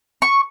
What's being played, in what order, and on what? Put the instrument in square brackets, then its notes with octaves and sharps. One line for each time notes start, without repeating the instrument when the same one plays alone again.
[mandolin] C#6